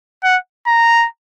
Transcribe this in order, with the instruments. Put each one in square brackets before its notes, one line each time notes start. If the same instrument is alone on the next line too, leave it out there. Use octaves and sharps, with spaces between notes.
[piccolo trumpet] F#5
A#5